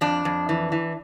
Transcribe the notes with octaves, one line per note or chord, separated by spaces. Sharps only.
F2 D4
F2
E3
E3